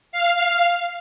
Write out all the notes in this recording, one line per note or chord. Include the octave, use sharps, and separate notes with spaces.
F5